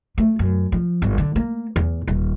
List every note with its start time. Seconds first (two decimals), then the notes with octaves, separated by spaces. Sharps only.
0.18 A3
0.39 F#2
0.72 F3
1.02 G1
1.18 D3
1.36 A#3
1.76 E2
2.08 D#1